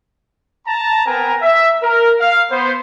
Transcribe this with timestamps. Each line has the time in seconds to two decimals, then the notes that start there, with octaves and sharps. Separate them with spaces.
0.67 A5 A#5
1.06 B3 C4 A#4 B4 G#5 A#5
1.42 E5
1.83 A#4
2.20 F5
2.51 B3 C5